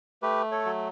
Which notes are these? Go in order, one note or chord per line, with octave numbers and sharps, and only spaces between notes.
A3 G4 B4
A4 C#5
F#3